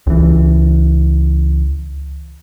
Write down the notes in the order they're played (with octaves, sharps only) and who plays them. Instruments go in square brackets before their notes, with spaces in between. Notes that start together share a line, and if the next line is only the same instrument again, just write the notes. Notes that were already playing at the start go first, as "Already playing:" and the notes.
[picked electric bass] C#2 E3